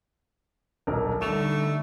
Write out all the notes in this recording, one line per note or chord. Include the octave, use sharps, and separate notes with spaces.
D#1 B1 A#4
D3 G3 A3 D#4 C#6 E7 F7